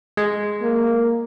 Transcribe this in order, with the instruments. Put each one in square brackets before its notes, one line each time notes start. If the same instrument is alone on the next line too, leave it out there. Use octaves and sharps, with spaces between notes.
[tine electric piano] G#3
[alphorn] A#3